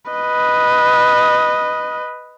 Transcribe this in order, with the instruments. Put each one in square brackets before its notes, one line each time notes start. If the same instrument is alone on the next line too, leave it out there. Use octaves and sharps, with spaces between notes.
[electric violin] B4 D#5